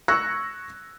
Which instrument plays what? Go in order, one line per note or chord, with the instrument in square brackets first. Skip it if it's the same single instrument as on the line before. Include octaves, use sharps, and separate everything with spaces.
[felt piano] C#6 E6 F#6 G#6 A#6 C#7